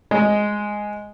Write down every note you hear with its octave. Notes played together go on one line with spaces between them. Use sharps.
G#3